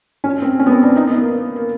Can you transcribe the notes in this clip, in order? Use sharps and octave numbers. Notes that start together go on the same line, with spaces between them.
C#4
C4
C#4
B3
C4
D4
D#4
B3
A#3
A#3